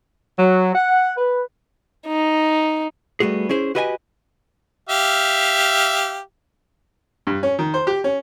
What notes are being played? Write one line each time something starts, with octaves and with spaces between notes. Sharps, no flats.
F#3
F#5
B4
D#4
G3 A3 B3 F#4 G#4
C#4 E4 G#4 C5
F#4 G4 B4 D#5 F#5 G#5
G4 E5 F5
G2
C#4
D#3
C5
G4
C#4